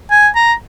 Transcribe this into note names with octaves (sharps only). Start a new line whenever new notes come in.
G#5
A#5